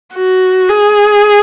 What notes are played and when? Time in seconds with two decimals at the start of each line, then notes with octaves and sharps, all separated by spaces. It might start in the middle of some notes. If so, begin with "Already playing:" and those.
0.15 F#4
0.69 G#4